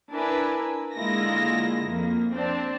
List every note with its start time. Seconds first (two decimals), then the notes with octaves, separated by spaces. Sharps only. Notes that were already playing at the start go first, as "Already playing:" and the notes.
0.11 D4 E4 A#4 B4 G#5
0.95 D3 G#3 A#3 E4 F4 A#6
1.86 F2 A#3
2.33 C4 D4